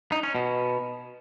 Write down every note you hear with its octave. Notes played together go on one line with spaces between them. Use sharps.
D#4
C#4
B2